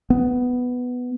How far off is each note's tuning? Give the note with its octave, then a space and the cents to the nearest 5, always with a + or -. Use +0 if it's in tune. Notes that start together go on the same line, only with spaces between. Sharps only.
B3 +5